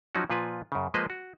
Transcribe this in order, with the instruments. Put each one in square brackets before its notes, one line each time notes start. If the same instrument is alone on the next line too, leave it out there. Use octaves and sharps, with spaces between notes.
[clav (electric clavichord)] F3 F#3 C#4 D#4 F#4
A#2 F3 F4 B4 G#5
F#2 C#3
F3 G#3 A#3 B4 C5 D#5
F#4